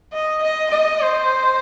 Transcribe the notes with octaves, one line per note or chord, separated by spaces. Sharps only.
D#5
D#5
D#5
C5